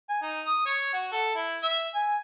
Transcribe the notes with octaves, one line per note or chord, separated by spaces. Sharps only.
G#5
D#4
D#6
C#5
F#4
A4
E4
E5
G#5